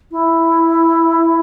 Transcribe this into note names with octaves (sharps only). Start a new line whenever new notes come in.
E4